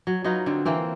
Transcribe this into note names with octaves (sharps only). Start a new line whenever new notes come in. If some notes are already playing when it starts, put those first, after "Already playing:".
F#3
F#3 D#4 F4 B4
D3 C4
E3 A#3 C4